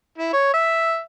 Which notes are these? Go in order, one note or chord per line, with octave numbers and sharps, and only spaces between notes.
E4
C#5
E5